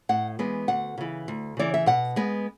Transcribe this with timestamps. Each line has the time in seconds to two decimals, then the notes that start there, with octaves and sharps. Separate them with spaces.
0.09 A2 F#5
0.39 E3 G#3 B3
0.68 D2 F#5
0.98 C#3 E3
1.28 D2
1.57 C#3 E3 D5
1.74 E5
1.86 B2 F#5
2.16 G#3 B3